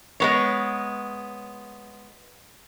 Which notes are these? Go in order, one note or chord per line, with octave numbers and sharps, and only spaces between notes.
G#3 B3 C#5